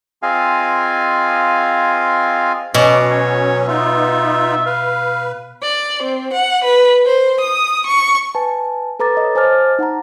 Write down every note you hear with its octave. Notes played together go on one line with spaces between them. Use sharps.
C4 F4 G#4 D#5 F5 G#5
B2 F#3 C#4 D6
C#5
B3 D#4 F4 E5
B4 F5
D5
C4
F#5
B4
C5
D#6
C#6
B4 G#5 A5
A4 B4 A#5 D6 A6
C#5 D#5
C5 G#5 A5 D6 F6 A6
D#4 F#5 A5 A#5